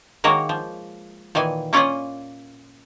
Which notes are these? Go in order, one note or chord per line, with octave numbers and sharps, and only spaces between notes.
D#3 G#3 A#3 F#4 A#4 C#5
F3
A#2 D#3 E3 G#5
A#3 C#4 F4 D5 D#5 G#5